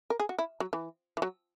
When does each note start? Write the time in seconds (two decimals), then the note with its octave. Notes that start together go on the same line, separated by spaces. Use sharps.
0.10 A#4
0.20 G#4
0.29 F#4
0.38 E4
0.60 F#3
0.73 E3
1.17 E3
1.22 F#3